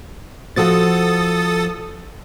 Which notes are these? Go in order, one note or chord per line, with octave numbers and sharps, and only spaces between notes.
F3 F#4 A4 C5 D#6 A6